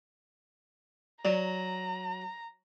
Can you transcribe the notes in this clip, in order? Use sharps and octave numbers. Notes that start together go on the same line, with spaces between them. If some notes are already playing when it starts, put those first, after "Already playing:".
F#3 D5 A#5